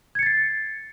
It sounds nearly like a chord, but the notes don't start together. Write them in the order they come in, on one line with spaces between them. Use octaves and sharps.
G#6 C#7 A6 C7